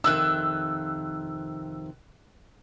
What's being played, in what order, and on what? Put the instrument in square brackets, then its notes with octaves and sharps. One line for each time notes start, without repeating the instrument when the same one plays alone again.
[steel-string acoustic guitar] F2 C3 D#3 [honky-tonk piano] E6 F#6